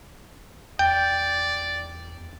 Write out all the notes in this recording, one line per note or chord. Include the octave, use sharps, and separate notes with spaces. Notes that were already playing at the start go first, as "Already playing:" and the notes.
E2 D5 G5